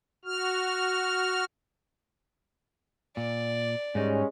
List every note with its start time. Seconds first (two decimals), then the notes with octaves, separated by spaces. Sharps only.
0.25 F#4 F6
3.17 A#2 D5
3.95 G#2 G3 G#3 C#4 D#4